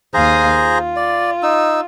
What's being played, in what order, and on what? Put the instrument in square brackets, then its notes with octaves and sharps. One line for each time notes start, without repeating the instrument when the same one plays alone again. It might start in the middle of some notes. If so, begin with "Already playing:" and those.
[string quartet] D#2 F5 D#6 [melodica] G#4 C5 A#5
[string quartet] F4
[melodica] D5
D#4 E6